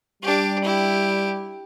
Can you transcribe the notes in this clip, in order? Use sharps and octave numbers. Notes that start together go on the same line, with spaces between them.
G3 D4 G4
E4 G4